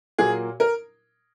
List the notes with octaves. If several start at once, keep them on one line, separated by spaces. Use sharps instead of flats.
A#2 F#3 A#3 G#4
A#4